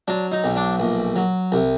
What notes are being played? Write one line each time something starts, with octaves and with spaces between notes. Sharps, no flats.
F#3 D4
D#4
B1
D4
A#1
F#3
C2